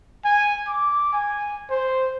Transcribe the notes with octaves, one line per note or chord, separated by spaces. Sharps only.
G#5
D6
G#5
C5